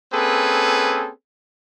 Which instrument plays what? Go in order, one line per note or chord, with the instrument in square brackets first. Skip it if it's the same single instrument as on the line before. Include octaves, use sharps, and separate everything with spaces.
[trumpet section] A#3 C4 C#4 G#4 A4 B4